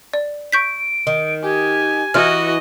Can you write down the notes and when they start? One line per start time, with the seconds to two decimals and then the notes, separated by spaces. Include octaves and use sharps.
0.13 D5
0.52 C#6 G6 B6 D7
1.07 D#3
1.42 G4 G#5
2.14 E3 E4 F#4 D#5 F6